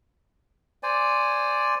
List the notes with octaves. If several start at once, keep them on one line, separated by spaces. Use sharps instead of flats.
C5 D5 G#5